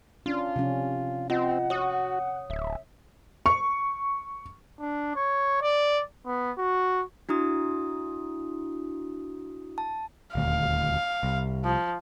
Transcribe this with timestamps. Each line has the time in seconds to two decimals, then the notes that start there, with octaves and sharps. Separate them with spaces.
0.26 C#4 D4 F4
0.56 C3 F3 C#4
1.30 C4 F4 D#5 F#5
1.70 F#4 C#5 D#6
2.50 D1 E5
3.46 C#6
4.80 D4
5.16 C#5
5.62 D5
6.26 B3
6.58 F#4
7.29 D4 E4 F#4 D#6
9.78 A5
10.35 D#1 D2 F5
11.23 C2
11.64 F3